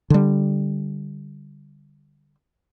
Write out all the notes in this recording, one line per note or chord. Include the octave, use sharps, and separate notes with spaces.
D3 G3